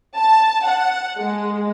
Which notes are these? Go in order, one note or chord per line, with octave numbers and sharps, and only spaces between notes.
A5
F#5
G#3